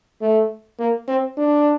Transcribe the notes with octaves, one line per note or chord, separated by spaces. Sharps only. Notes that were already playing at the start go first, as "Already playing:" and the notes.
A3
A#3
C4
D4